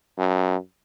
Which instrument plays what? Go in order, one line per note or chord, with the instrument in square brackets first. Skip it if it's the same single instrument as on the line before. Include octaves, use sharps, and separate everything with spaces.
[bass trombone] F#2